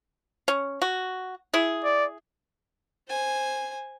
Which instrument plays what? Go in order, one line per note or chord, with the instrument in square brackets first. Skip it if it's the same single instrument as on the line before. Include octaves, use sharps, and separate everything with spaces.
[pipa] C#4
F#4
E4 G#4
[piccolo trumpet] D5
[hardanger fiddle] C5 G#5